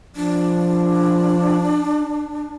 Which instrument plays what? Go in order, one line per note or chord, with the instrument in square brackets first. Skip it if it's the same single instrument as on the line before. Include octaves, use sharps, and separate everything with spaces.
[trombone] F3 [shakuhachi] D4